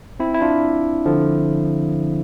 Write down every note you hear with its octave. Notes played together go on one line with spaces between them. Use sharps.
C4 E4
E4
D4 F4
D3 F3